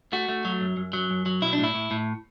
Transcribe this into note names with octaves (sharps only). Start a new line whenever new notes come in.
A3 F#4
A3
F#3
F#2
F#2
F#3
F#2
F#3
B1 E4
D4
A2
E4
A2
A2